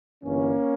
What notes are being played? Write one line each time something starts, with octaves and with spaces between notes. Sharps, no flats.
G1 G2 E3 A#3 C#4